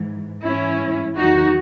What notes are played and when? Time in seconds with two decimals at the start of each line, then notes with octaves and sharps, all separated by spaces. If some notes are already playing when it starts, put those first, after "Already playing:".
Already playing: G#2 E3
0.44 G#2 E3 C#4 E4
1.16 E2 D#3 F#3 D#4 F#4